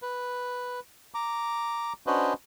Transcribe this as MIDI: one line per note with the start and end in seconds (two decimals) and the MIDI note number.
0.02 0.80 71
1.14 1.93 82
1.14 1.93 86
2.07 2.34 61
2.07 2.34 62
2.07 2.34 66
2.07 2.34 71
2.07 2.34 72
2.07 2.34 75